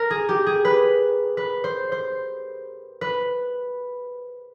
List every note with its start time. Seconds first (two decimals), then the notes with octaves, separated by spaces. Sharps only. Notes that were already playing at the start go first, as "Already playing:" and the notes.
Already playing: A#4
0.10 G#4
0.29 G4
0.46 G#4
0.65 B4
1.37 B4
1.64 C5
1.92 C5
3.01 B4